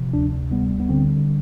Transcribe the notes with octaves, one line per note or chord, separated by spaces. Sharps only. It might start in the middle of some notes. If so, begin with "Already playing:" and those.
Already playing: C3 F3
D2 D4
G3 B3
B3
D3 C4